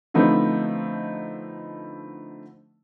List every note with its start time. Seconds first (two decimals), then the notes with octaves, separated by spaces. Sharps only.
0.14 D3 F3 A3 B3 C4 D#4